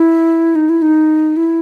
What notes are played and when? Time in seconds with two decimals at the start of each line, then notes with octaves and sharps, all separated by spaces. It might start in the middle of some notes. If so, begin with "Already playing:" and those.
Already playing: E4
0.55 D#4
0.69 E4
0.82 D#4
1.37 E4